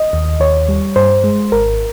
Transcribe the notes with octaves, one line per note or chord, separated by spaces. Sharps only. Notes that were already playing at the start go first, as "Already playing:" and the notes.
Already playing: D#5
D#2
D#2 C#5
G3
G2 C5
G#3
G#1 A#4